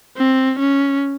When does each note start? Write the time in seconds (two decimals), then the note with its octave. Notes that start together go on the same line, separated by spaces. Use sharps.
0.17 C4
0.59 C#4